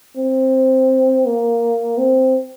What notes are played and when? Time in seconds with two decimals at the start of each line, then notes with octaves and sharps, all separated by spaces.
0.17 C4
1.25 A#3
1.98 C4